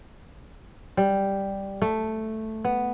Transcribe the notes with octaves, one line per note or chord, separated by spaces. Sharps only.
G3
A3
B3